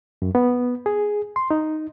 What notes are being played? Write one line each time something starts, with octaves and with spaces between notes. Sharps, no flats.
F#2
B3
G#4
C6
D#4